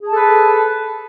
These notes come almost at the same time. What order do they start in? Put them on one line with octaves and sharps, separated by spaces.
G#4 A5 A4 B4